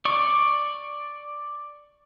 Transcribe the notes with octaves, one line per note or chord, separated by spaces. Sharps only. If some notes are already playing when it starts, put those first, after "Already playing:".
D5 C#6